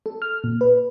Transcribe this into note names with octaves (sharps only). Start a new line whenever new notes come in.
A4
F6
A#2
B4